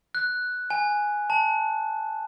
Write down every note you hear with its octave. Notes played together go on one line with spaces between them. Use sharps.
F#6
G#5
A5